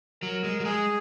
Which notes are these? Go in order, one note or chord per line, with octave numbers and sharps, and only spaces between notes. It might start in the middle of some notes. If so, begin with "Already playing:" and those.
F#3 A#4
G#3
F#3
G#3 G#4